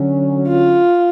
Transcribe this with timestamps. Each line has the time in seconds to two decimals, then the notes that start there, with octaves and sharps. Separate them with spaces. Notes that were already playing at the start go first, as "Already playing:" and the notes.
Already playing: D3 F#3 C#4
0.48 F4